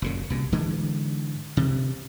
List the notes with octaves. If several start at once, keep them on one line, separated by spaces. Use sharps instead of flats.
F#1 A#2 C#3
C2 A#2
G#2 D3 E3 G#3
C3